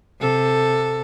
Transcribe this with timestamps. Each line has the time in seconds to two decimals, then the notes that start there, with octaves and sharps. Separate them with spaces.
0.20 C3 A4